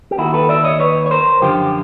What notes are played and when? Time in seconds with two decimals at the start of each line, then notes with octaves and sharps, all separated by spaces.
0.11 G4
0.18 D#2 D#3 E4 F#4
0.33 A4 B4
0.49 D5 E5
0.64 C#5 D#5
0.80 B4 C#5
1.06 C#5
1.11 A#4 C5
1.41 F#2 D3 F3 F4 G4